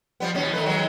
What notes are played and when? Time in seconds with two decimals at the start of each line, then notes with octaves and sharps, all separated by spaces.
0.20 F3 G3 B3
0.35 D#2 B2 C#4
0.54 D#3 A3 B4
0.66 D#3 F#3 G#3